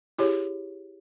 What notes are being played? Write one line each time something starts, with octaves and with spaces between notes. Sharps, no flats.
E4 G4 G#4 C#5